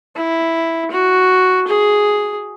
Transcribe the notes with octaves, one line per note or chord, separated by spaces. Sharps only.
E4
F#4
G#4